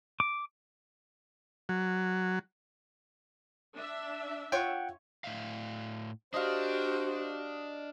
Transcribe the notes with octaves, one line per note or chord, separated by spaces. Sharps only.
D6
F#3
D4 E5
F4 C#5 F#5 G5
A2 E5 F5
D4 F#4 G4 C5 D#5 F5